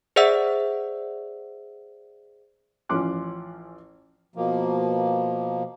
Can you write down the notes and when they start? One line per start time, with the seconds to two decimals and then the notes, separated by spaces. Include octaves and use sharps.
0.16 G#4 C5 D5 E5 F#5 E6
2.89 A1 F3 C#4 C6 D6 F#6
4.36 B2 F3 A#3